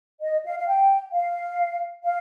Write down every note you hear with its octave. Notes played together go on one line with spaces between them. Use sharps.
D#5
F5
F5
G5
F5
F5